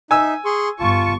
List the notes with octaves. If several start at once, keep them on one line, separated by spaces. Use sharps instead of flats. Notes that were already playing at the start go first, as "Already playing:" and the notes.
D#4 E5 G#5 E6
G#4 C6 C#6
G1 F4 A5 C#6